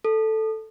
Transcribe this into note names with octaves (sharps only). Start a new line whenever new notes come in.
A4